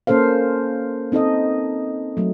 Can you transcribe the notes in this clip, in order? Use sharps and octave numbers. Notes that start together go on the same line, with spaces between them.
A#3 C#4 A4 C5 F5
C4 D#4 A4 D#5
F#3 A3